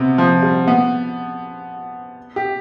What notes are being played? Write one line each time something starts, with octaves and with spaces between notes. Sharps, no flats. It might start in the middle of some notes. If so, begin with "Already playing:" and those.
Already playing: C3 B3
F3
G3
B3
G4